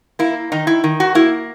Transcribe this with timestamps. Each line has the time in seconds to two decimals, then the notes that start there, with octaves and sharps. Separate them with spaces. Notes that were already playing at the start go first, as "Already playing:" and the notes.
0.19 A#3 E4
0.52 D#3 D#4
0.67 E4
0.84 D#3
1.00 F#4
1.15 A#3 E4